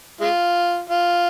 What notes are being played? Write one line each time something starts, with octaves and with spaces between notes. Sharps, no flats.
G#3 F4
F4